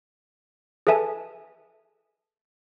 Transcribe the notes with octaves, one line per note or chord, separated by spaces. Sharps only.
G#4 A4 B4 E5 G#5 A5